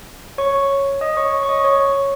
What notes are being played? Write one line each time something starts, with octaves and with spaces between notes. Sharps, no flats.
C#5 C#6
D#5 D#6
C#5 C#6
C#6
D#5 D#6
C#5 C#6